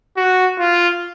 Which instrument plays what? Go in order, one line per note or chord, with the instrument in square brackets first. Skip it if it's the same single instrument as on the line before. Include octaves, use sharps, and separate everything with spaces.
[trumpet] F#4
F4